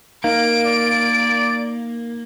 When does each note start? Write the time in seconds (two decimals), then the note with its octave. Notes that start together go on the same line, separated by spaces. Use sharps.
0.24 A#3 D#4 A#4 F5 D7
0.66 D5